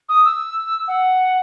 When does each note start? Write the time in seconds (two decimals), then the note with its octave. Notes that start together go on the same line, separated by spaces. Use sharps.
0.09 D#6
0.25 E6
0.88 F#5